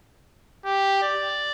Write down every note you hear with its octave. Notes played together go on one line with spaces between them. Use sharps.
G4
D5